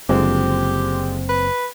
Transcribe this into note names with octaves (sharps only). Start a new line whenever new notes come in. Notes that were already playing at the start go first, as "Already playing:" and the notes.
F#1 D3 F3 G#3 C4 G4
B4